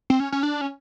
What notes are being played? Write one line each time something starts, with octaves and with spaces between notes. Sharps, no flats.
C4
C#4
C#4
D4
C#4